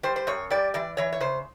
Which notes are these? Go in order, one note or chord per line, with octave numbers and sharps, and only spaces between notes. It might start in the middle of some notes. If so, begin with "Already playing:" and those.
G3 C5
C5
F#2 C#5
G3 D5
E3 D5
E3 C#5
C#5
C#3 C5